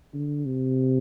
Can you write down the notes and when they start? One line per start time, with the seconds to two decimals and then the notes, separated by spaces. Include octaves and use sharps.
0.14 D3
0.46 C3